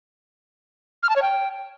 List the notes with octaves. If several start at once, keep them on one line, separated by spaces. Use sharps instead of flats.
F6
A5
C#5
G5